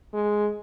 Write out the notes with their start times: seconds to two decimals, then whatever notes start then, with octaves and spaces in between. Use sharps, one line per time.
0.13 G#3